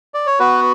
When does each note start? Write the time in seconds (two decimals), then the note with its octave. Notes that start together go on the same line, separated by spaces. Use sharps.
0.14 D5
0.26 C#5
0.40 B3 F#4 B4